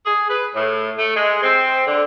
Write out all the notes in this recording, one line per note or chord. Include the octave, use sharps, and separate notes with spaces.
G#4
B4
A2
A3
G#3
C4
D3